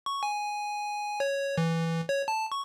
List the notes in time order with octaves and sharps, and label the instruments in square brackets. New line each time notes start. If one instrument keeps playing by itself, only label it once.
[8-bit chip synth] C#6
G#5
C#5
E3
C#5
A5
C#6